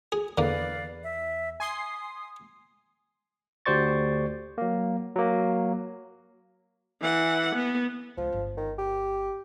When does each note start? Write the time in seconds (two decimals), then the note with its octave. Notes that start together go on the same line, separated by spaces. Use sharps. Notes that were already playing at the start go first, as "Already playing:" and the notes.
0.12 G#4
0.38 E2 D3 A#3 B4 D5 F5
1.03 E5
1.60 G#5 C6 D#6 C7
3.66 D2 G4 C5 D5 C#6 A6
4.58 F#3 A#3
5.16 F#3 A#3
7.01 E3 F#5
7.55 B3
8.17 C#2 D3 F3
8.33 G1
8.57 D#3
8.79 G4